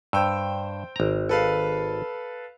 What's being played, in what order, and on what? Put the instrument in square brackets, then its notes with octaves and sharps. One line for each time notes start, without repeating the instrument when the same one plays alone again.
[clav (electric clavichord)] G2 [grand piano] C5 G5 E6
[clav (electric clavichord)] G#1 A#5
[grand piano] A4 B4 F5